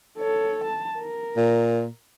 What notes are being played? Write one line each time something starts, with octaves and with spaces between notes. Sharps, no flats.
A4 C#5
A5
A#4
A#2